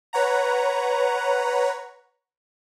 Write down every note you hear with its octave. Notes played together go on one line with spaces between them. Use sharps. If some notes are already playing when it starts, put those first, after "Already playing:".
B4 C#5 F#5 A#5